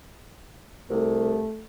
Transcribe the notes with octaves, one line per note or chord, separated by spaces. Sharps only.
C2 A3